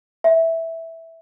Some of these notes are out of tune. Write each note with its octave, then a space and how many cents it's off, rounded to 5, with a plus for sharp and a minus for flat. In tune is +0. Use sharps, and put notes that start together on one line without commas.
E5 -10